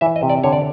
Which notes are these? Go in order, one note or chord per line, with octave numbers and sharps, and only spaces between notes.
E3 E5
D#5
C3
D5
D3 C#5
D5